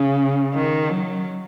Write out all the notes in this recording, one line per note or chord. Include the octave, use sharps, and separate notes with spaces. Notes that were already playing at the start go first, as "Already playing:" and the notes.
Already playing: C#3
D#3
F#3